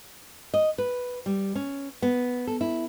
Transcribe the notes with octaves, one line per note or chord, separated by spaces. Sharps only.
D#5
B4
G3
C#4
B3
A4
E4